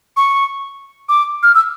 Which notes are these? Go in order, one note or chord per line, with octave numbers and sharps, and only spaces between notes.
C#6
D6
F6
E6